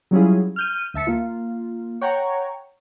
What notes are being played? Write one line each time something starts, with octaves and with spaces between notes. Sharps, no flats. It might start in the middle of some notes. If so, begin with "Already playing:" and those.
F#3 G3 C#4 E4 F4 G#4
F6 G6 D#7
D2 E5 A5 C#7
A#3 F4
C#5 F#5 G5 A#5 C#6